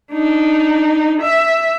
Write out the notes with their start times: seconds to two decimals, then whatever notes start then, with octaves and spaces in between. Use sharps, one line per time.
0.12 D4 D#4
1.21 E5